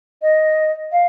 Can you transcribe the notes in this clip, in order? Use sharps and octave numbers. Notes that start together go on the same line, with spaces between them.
D#5
F5